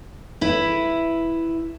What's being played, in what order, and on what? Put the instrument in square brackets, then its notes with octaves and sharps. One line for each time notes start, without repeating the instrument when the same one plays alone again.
[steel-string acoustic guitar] E4 B4